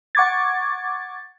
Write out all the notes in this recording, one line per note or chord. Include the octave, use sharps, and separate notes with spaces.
F#5 C#6 D6 G#6 A6